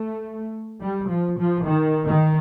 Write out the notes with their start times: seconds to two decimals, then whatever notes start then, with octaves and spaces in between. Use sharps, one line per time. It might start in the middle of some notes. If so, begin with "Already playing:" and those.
Already playing: A3
0.81 G3
1.09 F3
1.38 F3
1.66 D#3
2.07 D#3